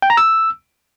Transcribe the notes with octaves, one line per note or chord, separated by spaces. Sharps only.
G5
A#5
E6